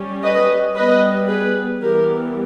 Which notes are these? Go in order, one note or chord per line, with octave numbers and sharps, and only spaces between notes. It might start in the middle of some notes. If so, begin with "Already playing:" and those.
Already playing: G3 C#4
B4 D#5
G3 B3 B4 D#5
G#4 B4
E3 G3 B3 G4 A#4